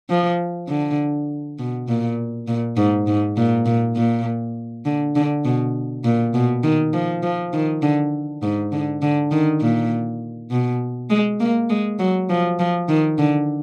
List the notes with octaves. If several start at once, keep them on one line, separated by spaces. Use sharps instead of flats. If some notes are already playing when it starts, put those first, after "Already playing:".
F3
D3
B2
A#2
A#2
G#2
G#2
A#2
A#2
A#2
D3
D3
B2
A#2
B2
D#3
F3
F3
D#3
D3
G#2
D3
D3
D#3
A#2
B2
G#3
A#3
G#3
F#3
F3
F3
D#3
D3